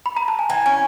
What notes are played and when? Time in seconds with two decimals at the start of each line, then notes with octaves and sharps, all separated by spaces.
0.06 B5
0.17 A#5
0.28 A5
0.39 G#5
0.50 E3 G5
0.66 C#4 G#5